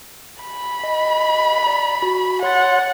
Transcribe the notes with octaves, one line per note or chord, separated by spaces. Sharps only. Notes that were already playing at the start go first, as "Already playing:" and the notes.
B5
D#5
D5 A#5
F#4
C#5 F#5 C6 A6